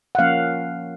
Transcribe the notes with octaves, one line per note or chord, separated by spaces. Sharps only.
F#5
F3 A#3 C#4 F5